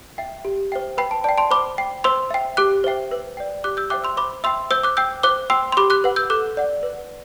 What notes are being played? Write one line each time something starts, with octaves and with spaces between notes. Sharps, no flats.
E5 G5
G4
C5 E5 G5
B4 G5 B5
A5
D5 G5 A5
A5 C6
C5 B5 D6
G5
C5 C6 E6
E5 G5
G4 D6 F#6
C5 E5 G5
B4
D5 G5
G4 D6 F#6
E6 G6
C5 E5 G5 D6 F#6
C6 E6
C5 B5 D6
E5 G5 C6 E6
C5 E6 G6
D6 F#6
G5 E6 G6
C5 D6 F#6
G5 C6 E6
C6
G4 B5 D6
D6 F#6
B4 F#5
E6 G6
A4 D6 F#6
D5 F#5
B4